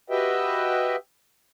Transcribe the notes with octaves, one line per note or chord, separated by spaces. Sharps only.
F#4 G4 B4 D#5 E5 G5